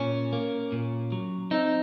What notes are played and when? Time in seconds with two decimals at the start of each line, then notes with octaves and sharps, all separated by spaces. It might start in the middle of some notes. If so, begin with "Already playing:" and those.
Already playing: A#2 C#4
0.33 A#3
0.72 A#2
1.12 F#3
1.51 C4 D#4